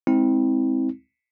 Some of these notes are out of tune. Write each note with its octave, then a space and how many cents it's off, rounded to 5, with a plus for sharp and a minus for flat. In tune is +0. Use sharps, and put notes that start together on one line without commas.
G#3 +0 C4 +0 E4 -40